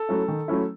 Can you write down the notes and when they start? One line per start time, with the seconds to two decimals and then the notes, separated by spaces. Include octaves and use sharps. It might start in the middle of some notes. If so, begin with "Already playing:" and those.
Already playing: A4
0.09 F#3 A3 C#4 E4
0.28 D#3
0.48 F#3 A3 C#4 E4